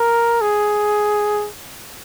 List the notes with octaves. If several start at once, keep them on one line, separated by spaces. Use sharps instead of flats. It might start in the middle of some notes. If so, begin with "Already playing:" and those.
Already playing: A#4
G#4